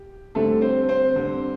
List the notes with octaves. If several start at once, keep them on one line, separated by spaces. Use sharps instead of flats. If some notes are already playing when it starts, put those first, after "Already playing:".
Already playing: G4
D3 G3 A3 C4 A4
C4 C5
C4 C5
D3 G3 C4